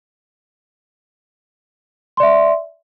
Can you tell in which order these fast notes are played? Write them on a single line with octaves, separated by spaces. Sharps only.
C6 D5 E5